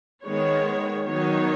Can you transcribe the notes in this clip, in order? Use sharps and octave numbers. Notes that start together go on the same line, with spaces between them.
D#3 G#3 B3 C#5
D#3 F#3 B3 D#4 C#5